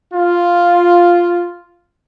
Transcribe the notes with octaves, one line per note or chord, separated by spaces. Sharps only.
F4